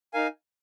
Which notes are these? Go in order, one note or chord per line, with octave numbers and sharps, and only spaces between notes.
D#4 A#4 F5 G#5